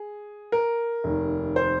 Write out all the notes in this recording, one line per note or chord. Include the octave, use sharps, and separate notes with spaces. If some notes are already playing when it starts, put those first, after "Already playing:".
Already playing: G#4
A#4
F1 D#2 D#3
C5